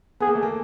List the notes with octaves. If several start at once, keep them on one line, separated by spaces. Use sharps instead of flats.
B3 G#4
A#3
A3
A#3